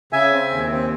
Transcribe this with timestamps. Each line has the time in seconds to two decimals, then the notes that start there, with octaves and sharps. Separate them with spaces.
0.13 C#3 E5 G#5
0.32 C4
0.51 D#2
0.71 C4